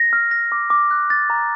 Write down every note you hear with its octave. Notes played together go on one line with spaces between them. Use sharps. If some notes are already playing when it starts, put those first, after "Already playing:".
Already playing: A#6
F6
A#6
D6
D6
F#6
A6
A#5